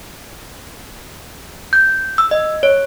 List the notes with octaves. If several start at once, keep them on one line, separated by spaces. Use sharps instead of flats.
G6
E6
D#5
C#5